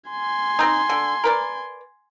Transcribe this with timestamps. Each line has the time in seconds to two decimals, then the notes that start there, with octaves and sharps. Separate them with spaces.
0.10 G#5 C6
0.59 C4 D#4
0.89 D3
1.24 A#4 B4 D5